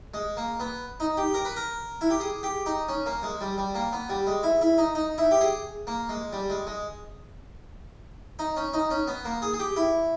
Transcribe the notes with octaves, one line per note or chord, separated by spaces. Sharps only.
G#3
A#3
B3
D#4
G4
A#4
B4
A#4
E4
G4
G#4
G4
D#4
C#4
A#3
G#3
G3
G3
A#3
B3
G3
G#3
E4
E4
D#4
D#4
E4
G4
G#4
A#3
G#3
G3
G#3
G#3
D#4
C#4
D#4
C#4
B3
A#3
G#4
G#4
G4
E4